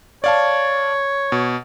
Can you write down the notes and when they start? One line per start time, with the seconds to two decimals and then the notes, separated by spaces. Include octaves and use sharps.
0.24 C#5 D5 F5 A5
1.32 B2